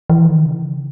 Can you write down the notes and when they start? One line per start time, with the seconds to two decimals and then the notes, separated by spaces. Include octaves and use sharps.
0.10 E3
0.27 D#3
0.45 C#3